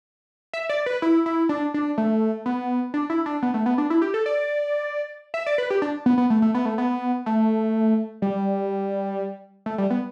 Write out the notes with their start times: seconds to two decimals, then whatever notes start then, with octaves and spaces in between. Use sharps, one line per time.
0.54 E5
0.69 D5
0.86 B4
1.02 E4
1.26 E4
1.49 D4
1.74 D4
1.98 A3
2.46 B3
2.94 D4
3.10 E4
3.26 D4
3.42 B3
3.54 A3
3.66 B3
3.78 D4
3.90 E4
4.02 G4
4.14 A4
4.26 D5
5.34 E5
5.46 D5
5.58 B4
5.70 G4
5.82 D4
6.06 B3
6.18 B3
6.30 A3
6.42 A3
6.55 B3
6.65 A3
6.78 B3
7.26 A3
8.22 G3
9.66 A3
9.78 G3
9.90 B3